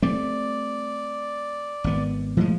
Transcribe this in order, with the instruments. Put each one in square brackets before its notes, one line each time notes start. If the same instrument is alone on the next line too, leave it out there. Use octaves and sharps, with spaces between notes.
[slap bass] G3 A3 C4 [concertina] D5
[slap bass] G#1 B3
[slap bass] A2 G#3 [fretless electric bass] F3